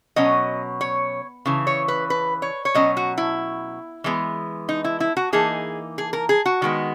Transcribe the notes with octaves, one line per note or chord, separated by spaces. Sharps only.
B2 F#3 C#4 D#5
C#5
C#3 E3
C#5
B4
B4
C#5
C#5
B2 F#3 C#4 D#5
F#4
E4
E3 G#3 B3
D#4
E4
E4
F#4
E3 A#3 D#4 G#4
G#4
A#4
G#4
F#4
D#3 G#3 B3